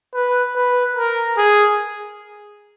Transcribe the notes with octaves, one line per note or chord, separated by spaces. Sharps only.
B4
B4
A#4
G#4